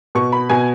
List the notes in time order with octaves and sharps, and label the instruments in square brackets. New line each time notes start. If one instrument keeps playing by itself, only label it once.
[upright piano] B2 C#6
B5
B2 G#5